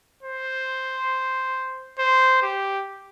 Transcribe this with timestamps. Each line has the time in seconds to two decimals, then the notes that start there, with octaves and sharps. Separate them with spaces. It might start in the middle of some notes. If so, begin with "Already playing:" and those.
0.23 C5
1.99 C5
2.42 G4